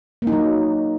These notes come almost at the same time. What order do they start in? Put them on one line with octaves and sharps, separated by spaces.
A#3 D#4 F#3